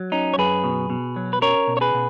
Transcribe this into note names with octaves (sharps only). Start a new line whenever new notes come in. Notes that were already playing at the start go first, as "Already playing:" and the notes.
Already playing: F#3
C#4 D#4
C#5
F#2 G#4 B4
B2
B2
F#3
B4
C#4 A#4 C#5
B2
C#5
G#4 B4
B2